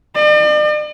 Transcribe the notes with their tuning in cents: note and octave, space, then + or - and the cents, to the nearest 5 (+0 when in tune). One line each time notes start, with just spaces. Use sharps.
D5 +45